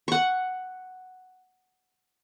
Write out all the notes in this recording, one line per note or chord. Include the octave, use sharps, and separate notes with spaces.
F#5 C#6